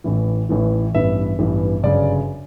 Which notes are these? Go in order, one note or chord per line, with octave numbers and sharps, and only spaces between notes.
A1 A2 E3
A1 A2 E3
A1 G2 E3 B3 E5
A1 G2 E3 B3
G1 F#2 C#3 D5